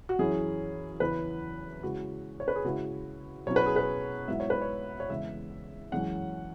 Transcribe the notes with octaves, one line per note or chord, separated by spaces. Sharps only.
F#4
F#2 E3 C#4 E4 G#4
E2 C#3 E3 C#4 E4 B4
C#3 G#3 E4 F#4
C#5
B4
G#4
C#3 G#3 E4 F#4
B2 F#3 C#4 E4 C#5
B4
G#4
B4
G#2 F#3 B3 E4 E5
C#5
B4
C#5
C#5
E2 C#3 G#3 E5
F#2 E3 G#3 C#4 F#5